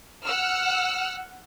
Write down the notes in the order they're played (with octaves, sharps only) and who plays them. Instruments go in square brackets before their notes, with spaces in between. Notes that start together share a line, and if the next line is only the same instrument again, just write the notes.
[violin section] F#5 E6 F6